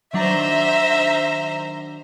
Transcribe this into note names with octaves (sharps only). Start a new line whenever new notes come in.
D#3 F#3 D4 C5 E5 A#5